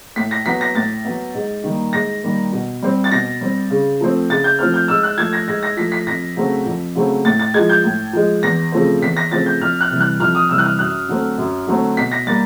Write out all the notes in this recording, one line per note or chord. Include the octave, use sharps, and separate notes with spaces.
A2 B6
A#6
F#3 B3 B6
A#6
A2 A6
F#3 B3
G#2
D#3 G3 A#3
G#2 A#6
D#3 G3 A#3
B2
G3 C4
A6
B2 A#6
G3 C4
C#3
F3 A3 C4
C#3 A6
G6
F3 A3 C4 F6
G6
G#2 E6
F#6
F3 A3 G#6
A#6
G#2 A#6
A#6
F3 A3 B6
B6
F2 A#6
C#3 F#3 A3 C4
F2
C#3 F#3 A3 C4
A2 A6
A6
F3 G#3 G#6
G6
A2
F3 G#3
E2 A#6
C#3 F3 A3 C4
E2 B6
A#6
C#3 F3 A3 C4 A6
G6
F2 F6
F#6
C3 E3 G3
F#6
F2 F6
D#6
C3 E3 G3 E6
F#6
F6
F#2 F#6
D3 F#3 A3 C4
F#2
D3 F#3 A3 C4
B2 B6
A#6
G3 A#3 A6